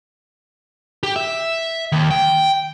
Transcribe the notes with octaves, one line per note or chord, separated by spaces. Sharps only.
G4
E5
D#2
G5